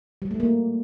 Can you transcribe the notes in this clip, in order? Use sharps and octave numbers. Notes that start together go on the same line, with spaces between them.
G3
A3
A#3